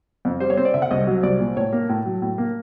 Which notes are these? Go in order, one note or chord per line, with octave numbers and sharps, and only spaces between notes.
F2
G3 C5
C#5
C4 C5
D5
D3 E5
F#5
C2 D#5
F#3
C2 D5
A#2
A2 C#5
A#3
A2
F#3
A2
A#3